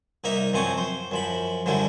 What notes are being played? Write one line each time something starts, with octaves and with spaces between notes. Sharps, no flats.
C2 A#3 D#4 E5 A#5
F#2 F3 C4 G#5 C#6
C5
F#2 F3 B5
F#2 D3 F3 G3 E4